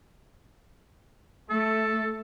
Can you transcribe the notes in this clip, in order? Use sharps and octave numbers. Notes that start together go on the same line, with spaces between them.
A3 A4